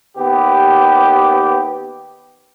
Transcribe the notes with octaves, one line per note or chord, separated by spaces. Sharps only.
D#2 B3 G4